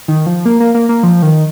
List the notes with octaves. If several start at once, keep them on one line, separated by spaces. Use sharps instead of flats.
D#3
F3
A#3
A#3
A#3
A#3
F3
D#3